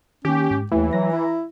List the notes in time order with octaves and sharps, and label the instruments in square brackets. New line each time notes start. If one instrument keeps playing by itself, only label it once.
[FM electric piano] D#3 A#3 [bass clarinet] C#4 [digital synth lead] G4
[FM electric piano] G#2
[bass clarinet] D#2 [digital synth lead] E3 [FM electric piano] A3 E4 G4
[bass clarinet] F#3 [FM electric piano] E5 A#5 A#6
[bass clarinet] E4